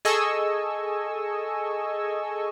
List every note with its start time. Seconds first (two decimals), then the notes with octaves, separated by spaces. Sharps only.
0.05 G#4 A4 D#5 G#5 C#6 E6